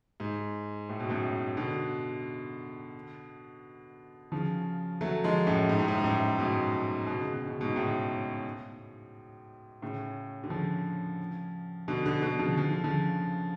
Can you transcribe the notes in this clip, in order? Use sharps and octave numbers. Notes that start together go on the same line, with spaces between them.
G#2
A2
B2
F#2 A2
B2 D3
C#3 F3
F#3 A3
F3 G#3
F#2 A2
G#2
A2
G#2
G#2
F#2 A2
G#2 B2
B2
C#3
B2
C#3
G#2 B2
A2 C#3
A2 C#3
D3
C#3 F3
B2 D3
B2 D3
B2 D3
C#3 F3
F3
D3
C#3 F3